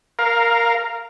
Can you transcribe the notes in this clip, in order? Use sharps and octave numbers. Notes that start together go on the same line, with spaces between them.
A#4 F5